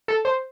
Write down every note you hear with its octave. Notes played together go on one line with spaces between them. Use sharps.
A4
C5